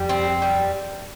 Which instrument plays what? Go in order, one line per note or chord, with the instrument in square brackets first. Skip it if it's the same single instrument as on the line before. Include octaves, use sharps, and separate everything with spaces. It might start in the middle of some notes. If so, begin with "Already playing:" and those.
Already playing: [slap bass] F2 [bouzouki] G3
[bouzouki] C4
G3